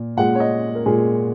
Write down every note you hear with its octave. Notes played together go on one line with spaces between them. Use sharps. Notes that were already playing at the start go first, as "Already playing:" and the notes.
Already playing: A#2
A#2 G#3 F#5
C#5
D#5
A#4
A#2 G#3 G#4